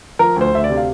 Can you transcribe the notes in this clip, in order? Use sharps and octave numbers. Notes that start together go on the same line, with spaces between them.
F3 A#4
D2 C5
D2 E5
D5
C3
F5